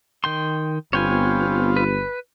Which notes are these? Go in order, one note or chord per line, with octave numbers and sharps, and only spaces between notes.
D#3 G5 C6
G1 B3 C4 F4 C#5 G5 G#5
B4